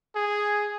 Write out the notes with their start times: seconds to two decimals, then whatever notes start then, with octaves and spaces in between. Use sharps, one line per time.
0.15 G#4